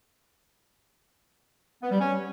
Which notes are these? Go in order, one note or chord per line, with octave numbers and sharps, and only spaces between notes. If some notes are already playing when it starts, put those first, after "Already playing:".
B3
G3
C#4